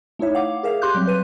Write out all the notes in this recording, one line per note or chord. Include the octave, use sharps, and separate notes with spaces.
A3 D#4 E4 C#5 E5
F5 F#5 D6
G#4 A#4 E5 F5
G4 C6 D6 F#6 G6
F#3 G3 C4
B4 D#7